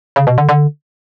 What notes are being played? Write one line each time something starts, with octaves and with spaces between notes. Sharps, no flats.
C#3
B2
D3
D3